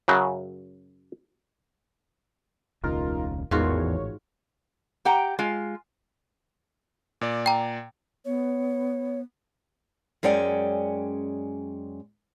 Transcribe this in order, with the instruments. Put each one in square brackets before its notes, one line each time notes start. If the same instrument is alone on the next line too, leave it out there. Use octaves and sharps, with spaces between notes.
[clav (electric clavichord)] F#2 C#3 F#3
[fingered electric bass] E1 C#2 C#3 [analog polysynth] D#4 F4 A#4
[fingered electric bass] A1 [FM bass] E2 [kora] G#2 F4 F#4 [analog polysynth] D#3 C#5
[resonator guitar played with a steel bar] G4 F#5 G5 A#5
G#3 F4
[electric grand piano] A#2 D5
[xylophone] G5 A#5
[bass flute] B3 [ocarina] C#5
[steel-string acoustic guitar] F#2 G#3 C#4 D5 G5 G#5